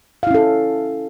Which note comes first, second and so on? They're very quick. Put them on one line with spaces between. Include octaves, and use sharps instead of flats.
F5 E4 C#4 A4